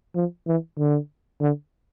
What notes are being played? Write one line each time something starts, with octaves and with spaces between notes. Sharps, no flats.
F3
E3
D3
D3